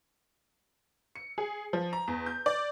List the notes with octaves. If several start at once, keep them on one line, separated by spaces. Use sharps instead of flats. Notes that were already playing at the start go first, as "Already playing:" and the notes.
C#7
G#4
F3
A#5
E2
G6
D5